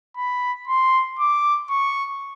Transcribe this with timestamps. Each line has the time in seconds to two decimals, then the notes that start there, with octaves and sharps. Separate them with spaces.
0.17 B5
0.67 C6
1.19 D6
1.70 C#6